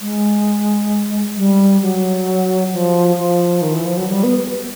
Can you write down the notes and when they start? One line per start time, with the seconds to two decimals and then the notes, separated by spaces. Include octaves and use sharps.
0.01 G#3
1.36 G3
1.82 F#3
2.72 F3
3.18 F3
3.61 D#3
3.74 E3
3.85 F3
3.97 F#3
4.09 G3
4.23 B3